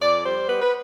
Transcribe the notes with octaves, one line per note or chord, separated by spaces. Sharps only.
F2 D5
G3 C5
B3 B4
B4